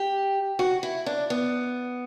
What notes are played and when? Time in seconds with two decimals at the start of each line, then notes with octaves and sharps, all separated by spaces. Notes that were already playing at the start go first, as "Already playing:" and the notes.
Already playing: G4
0.59 F#4
0.83 E4
1.06 D4
1.30 B3